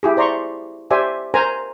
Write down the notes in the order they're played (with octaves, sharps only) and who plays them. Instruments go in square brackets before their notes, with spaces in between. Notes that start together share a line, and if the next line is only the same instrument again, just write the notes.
[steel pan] E4 G4 G#4
C5 D5 A#5 C6 C#6
G4 C5 D5 E5 G#5
A#4 C5 G#5 A#5